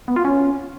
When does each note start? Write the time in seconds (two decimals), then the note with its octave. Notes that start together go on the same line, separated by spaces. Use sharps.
0.08 B3
0.16 F4
0.25 C#4